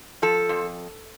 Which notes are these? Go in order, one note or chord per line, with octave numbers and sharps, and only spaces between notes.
F3 A4
F2